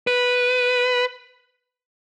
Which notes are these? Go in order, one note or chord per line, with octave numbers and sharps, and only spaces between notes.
B4